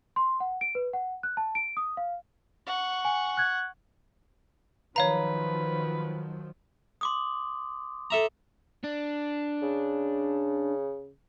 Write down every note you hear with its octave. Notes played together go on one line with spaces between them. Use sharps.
C6
F#5
D7
B4
F#5
F#6
A5
D7
D#6
F5
F#5 C#6
G#5
F#6 G#6
D#3 F3 F#3 B4 C#5 F5 A#5
C6 D6 D#6
A4 E5 A#5
D4
C#3